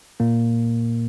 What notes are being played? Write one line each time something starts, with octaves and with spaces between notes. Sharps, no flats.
A#2 A#3